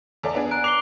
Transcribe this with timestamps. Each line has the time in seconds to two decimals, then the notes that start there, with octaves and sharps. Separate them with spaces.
0.23 E2 A4 D5
0.35 B3 D4 G#4
0.51 A#5 F#6 D7
0.64 D6 C7 F7 G7